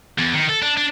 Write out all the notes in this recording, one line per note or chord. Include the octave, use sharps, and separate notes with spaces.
E2
D#3
A4
D4
D4